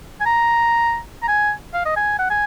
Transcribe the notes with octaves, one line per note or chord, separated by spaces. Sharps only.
G#5
A#5
A#5
G#5
F5
D#5
G#5
F#5
G#5